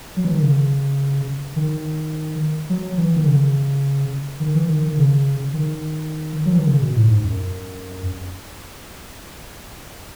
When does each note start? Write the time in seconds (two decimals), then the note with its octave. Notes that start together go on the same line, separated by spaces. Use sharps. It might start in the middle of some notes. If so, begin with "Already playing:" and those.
0.16 F#3
0.25 E3
0.33 D#3
0.42 C#3
1.56 D#3
2.69 F#3
2.97 E3
3.16 D#3
3.26 C#3
4.40 D#3
4.55 E3
4.68 D#3
4.83 D#3
4.97 C#3
5.54 D#3
6.45 F#3
6.53 E3
6.60 D#3
6.67 C#3
6.81 B2
6.96 A2
7.10 G#2
7.24 F#2